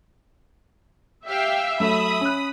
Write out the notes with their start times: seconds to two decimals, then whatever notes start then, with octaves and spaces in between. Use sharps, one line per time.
1.26 G4 E5 F5 G5
1.80 F#3 A3 B5 D#6
2.21 C#4 F#6